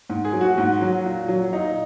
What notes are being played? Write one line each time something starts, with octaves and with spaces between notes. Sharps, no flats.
G#2
G#4
F#3
F#4
G#2
F#3
A#2
F#3
A#2 D#4